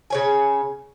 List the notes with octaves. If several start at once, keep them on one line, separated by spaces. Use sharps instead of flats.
C#3 C#5 G#5